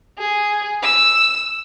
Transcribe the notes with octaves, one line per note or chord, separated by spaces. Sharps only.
G#4
E6